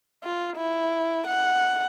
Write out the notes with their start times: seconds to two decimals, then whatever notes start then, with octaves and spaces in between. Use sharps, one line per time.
0.24 F4
0.57 E4
1.27 F#5